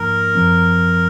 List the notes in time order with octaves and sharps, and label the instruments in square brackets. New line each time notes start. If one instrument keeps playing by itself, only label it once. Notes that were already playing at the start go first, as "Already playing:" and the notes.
Already playing: [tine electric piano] G#2 F3 A#3 D#4 [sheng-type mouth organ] A#4
[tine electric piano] F#2 F3 C4